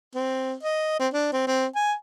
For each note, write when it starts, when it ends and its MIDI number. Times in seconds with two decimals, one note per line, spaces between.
0.15 0.54 60
0.63 0.97 75
1.00 1.08 60
1.13 1.28 62
1.32 1.46 60
1.47 1.66 60
1.76 1.93 80